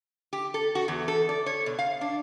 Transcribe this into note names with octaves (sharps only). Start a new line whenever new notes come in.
G4
A4
F#4
E2
A4
D5
C#5
B2
F5
D4